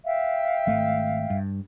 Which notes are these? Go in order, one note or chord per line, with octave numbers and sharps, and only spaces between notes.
E5 F5 G5
G#1 A3
G2